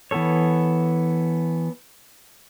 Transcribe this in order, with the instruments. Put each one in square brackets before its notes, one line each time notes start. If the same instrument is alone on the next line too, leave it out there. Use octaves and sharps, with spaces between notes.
[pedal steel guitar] E3 B3 A4 C#5